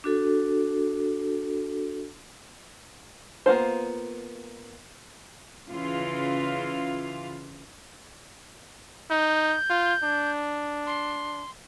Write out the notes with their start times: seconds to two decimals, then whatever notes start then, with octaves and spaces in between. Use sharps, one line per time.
0.04 D4 F#4 A4
3.46 A#3 B3 F4 C5
5.69 C#3 E3 F4 F5
9.10 D#4 G6
9.69 F4
10.03 D4
10.87 C6